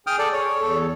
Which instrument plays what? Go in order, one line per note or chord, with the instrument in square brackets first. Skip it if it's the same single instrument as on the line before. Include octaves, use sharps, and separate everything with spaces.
[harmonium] G#4 [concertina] G5 D#6 F6
[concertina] A4 D5
C#5
[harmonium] E2 A4